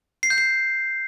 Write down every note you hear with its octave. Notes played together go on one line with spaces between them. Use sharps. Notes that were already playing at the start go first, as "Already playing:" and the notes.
C7
G6
C7